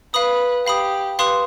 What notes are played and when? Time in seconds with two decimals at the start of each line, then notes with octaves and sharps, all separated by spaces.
0.14 B4 F5 B5 D#6
0.66 G4 F5 B5 D#6
1.19 G4 B4 F5 C6 D#6